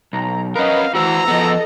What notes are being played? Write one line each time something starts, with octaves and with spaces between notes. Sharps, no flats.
B1 A#5
C#4 A#4 B4 D#5 F5
E3 F#4 C5 A#5 E6
F3 B3 A4 D#5